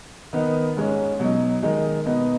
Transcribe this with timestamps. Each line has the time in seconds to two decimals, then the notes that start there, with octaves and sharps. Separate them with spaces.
0.33 D#3 B3 D#4
0.76 G#2 G#3 C#4
1.19 B2 F#3 D#4
1.62 D#3 G#3 D#4
2.06 B2 B3 D#4